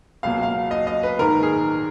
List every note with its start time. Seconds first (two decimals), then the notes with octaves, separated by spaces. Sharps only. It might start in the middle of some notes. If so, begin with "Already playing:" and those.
0.23 C#2 B2 F#3 A#3 F5
0.43 F5
0.71 D#5
0.87 D#5
1.03 B4
1.19 A#1 G#2 D#3 A#4
1.43 G#4